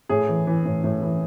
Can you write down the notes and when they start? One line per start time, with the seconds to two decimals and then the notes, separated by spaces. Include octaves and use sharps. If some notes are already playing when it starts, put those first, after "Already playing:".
0.09 A2 G#4
0.28 E3
0.47 E3
0.65 A2
0.84 A2
1.02 E3